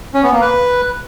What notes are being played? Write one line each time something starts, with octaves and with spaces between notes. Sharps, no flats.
C#4
B3
A#3
B4